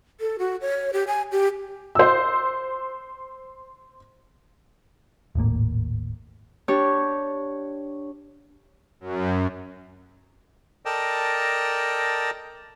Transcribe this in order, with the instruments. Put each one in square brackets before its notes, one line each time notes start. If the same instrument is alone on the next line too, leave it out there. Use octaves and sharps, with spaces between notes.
[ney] A4
F#4
C#5
G4
G#5
G4
[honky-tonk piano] C5 E6
[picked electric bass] D#1 G#1 A2 A#3
[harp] D4 G4 C#5
[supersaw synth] F#2
[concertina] A4 A#4 D5 D#5 G5 A5